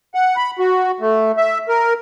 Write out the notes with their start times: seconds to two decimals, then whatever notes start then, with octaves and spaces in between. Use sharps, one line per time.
0.14 F#5
0.36 B5
0.59 F#4
1.00 A3
1.37 E5
1.69 A#4